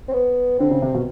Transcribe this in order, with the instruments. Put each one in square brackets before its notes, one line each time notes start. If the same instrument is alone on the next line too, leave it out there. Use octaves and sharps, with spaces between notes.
[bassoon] C4
B3
[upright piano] D3 [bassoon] C4
[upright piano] C#3
C3
B2